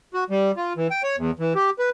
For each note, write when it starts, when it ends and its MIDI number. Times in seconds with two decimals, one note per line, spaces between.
0.14 0.24 66
0.30 0.52 55
0.57 0.73 65
0.77 0.88 52
0.91 1.02 79
1.03 1.16 73
1.18 1.31 40
1.39 1.53 52
1.55 1.70 67
1.79 1.90 71